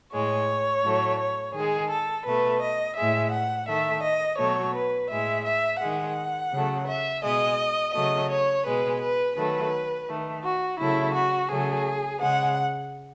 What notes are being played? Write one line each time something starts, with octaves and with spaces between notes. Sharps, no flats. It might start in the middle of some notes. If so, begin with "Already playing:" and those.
A2 G#3 C#5
A2 F#3 A3
C#5
D#3 G#3 G#4
A4
B2 A3 B4
D#5
A2 G#3 E5
F#5
D#3 A3 E5
D#5
B2 F#3 A3 C#5
B4
A2 G#3 E5
E5
D#3 G#3 F#5
C#3 F#3 A3
E5
B2 G#3 D#5
C#3 F#3 A3 D#5
C#5
B2 G#3 B4
B4
D#3 F#3 A3 B4
D#3 A3
F#4
C#3 F#3 A3 E4
F#4
C#3 F#3 A3 G#4
C#3 G#3 F#5